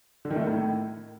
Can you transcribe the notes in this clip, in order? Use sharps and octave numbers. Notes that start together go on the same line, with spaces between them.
D3
D#3
A3
D#3
A2